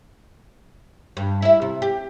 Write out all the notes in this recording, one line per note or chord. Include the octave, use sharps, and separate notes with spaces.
G2
E4 E5
C3
G4